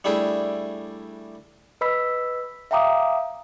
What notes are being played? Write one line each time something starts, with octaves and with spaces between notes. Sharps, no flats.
G3 A3 D4 E4 G4 G#4
B4 D#5 B5 E6 B6
E5 F5 G5 A#5 D6 D#6